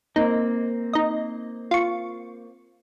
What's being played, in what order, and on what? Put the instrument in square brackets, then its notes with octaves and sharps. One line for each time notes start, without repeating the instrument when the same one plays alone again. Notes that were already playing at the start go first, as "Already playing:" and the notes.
[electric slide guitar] A#3 C4 [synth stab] D#4
[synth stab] D#4 D#5
F4 C#6